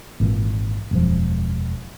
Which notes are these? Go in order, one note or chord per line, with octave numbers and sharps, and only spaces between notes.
G#1 A#2 E3
E1 F#2 F3